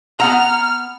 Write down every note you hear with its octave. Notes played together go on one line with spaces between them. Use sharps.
B3 F#5 A#5 F6